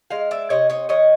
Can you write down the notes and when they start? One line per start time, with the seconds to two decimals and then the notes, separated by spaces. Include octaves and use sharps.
0.11 G#3 D#5 F5
0.31 D5 E5
0.50 C3 C#5 D#5
0.70 C#5 D#5
0.89 D#3 C#5 D#5